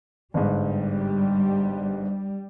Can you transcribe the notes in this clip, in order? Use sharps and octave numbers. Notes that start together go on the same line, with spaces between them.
G1 G#2 G3